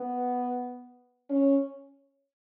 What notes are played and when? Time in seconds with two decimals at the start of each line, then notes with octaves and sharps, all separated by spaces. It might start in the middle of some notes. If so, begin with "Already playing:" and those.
Already playing: B3
1.29 C#4